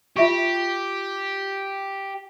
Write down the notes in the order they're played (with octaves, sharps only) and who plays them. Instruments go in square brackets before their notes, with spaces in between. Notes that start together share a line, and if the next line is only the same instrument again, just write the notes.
[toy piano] F4 E5 C#6 [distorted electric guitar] G4